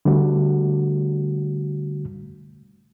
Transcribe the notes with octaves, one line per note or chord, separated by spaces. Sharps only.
D3 G3 A3 F#4